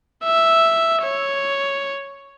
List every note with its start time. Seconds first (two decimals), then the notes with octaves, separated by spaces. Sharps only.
0.24 E5
1.03 C#5